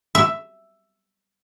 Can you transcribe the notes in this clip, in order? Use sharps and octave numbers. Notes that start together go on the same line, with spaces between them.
E5